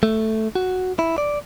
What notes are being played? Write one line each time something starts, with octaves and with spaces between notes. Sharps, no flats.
A3
F#4
E4
D5